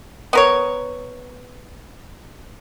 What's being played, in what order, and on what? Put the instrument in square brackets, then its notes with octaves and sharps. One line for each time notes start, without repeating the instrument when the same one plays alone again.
[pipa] B3 A#4 C#5